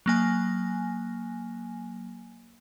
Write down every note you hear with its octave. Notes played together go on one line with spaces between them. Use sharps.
F#3 A#3 G#5